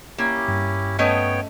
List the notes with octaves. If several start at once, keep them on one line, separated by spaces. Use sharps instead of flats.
A#3 C#4 E4 G4
G2
A3 B3 C#4 C#5 D#5 G5